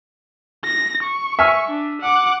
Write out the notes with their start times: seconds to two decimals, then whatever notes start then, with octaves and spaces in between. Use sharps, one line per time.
0.64 A#6
1.03 C#6
1.39 E5 G#5 F6
1.70 D4
2.01 F#5 D6